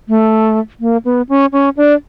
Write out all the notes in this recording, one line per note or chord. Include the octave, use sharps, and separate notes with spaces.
A3
A#3
B3
C#4
C#4
D4